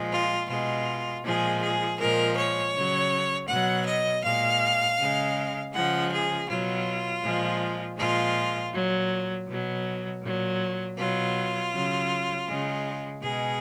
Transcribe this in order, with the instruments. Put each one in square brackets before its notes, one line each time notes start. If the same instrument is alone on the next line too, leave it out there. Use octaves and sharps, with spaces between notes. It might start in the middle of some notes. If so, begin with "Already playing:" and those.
Already playing: [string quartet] A#2 F3 G#3
F4
B2 G#3 F4
A#2 F3 G#3 G#4
G#4
A#2 F3 G#3 A#4
C#5
C#3 F#3
B2 F#3 F#5
D#5
A#2 G#3 F5
C#3 G#3
C#3 F3 G#3 F#5
G#4
B2 F#3 F4
A#2 F3 G#3
A#2 F3 G#3 F4
A#2 F#3
B2 F#3
A#2 F#3
B2 F#3 F4
C#3 F#3
C#3 G#3
B2 G#3 G#4